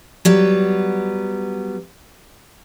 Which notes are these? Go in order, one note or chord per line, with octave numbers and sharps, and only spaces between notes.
F#3 G3 B3